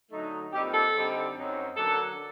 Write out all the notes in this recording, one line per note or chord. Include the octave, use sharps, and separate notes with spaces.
D3 F#3 A3 D#4
A#2 G3 C4 D#4 G4
A4
D3 G3 C4 D#4
F#2 F#3 C4 D#4
D3 F#3 A#3 D4 A4